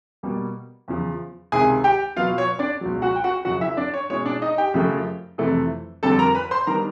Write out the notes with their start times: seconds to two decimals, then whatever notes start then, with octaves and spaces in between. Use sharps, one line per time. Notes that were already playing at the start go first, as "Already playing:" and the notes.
0.23 B2 G3 A#3
0.88 E2 C#3 F3
1.52 C#2 C3 D#3 G#4 G#5
1.84 G4 G5
2.16 B2 F#3 B3 F4 F5
2.38 C#5
2.59 D4 D5
2.81 C#2 B2 F#3
3.02 F#4 F#5
3.16 G5
3.24 F#4 F#5
3.45 F#2 C#3 F3 F#4 F#5
3.61 E4 E5
3.77 D4 D5
3.94 C#5
4.10 B2 G#3 C#4 E4 C#5
4.26 D4 D5
4.42 D#4 D#5
4.58 G4 G5
4.74 F#2 C#3 F3 A3
5.38 F2 C3 E3 A3
6.03 F2 D3 G3 C4 A4 A5
6.19 A#4 A#5
6.35 B4 B5
6.51 C5 C6
6.67 D#3 G3 B3 D4 A#4 A#5